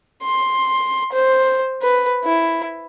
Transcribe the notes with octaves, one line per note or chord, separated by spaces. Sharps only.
C6
C5
B4
E4